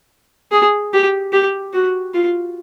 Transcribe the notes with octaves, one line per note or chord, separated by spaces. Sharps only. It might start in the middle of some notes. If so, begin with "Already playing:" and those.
G#4
G4
G4
F#4
F4